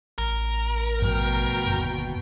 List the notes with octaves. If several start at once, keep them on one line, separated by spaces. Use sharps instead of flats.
A1 A#4
G2 B2 F3 A3 G5
G1 D#2